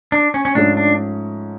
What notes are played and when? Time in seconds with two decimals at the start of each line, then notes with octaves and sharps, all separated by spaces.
0.12 D4
0.34 C#4
0.45 C#4
0.55 G#2 F3 A3 C#4 D4
0.77 D4